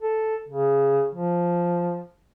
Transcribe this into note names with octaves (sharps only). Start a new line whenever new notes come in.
A4
C#3
F3